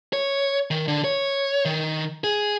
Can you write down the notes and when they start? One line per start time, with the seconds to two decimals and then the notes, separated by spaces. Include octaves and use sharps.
0.13 C#5
0.71 D#3
0.88 D3
1.04 C#5
1.65 D#3
2.24 G#4